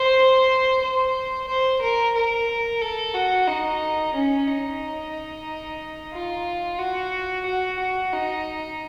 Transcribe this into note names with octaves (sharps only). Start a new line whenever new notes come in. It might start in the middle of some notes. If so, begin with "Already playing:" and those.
Already playing: C5
C5
C5
A#4
A#4
A4
F#4
D#4
C#4
D#4
F4
F#4
F#4
F#4
D#4